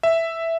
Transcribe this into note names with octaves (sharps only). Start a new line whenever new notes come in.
E5